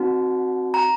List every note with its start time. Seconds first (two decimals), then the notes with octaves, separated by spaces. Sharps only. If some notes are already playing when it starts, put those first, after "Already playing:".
Already playing: C4 D#4 F#4
0.74 A#5